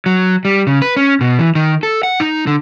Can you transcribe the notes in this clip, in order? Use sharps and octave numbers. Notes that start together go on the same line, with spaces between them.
F#3
G3
C#3
B4
C#4
B2
E3
D#3
A4
F#5
D#4
D3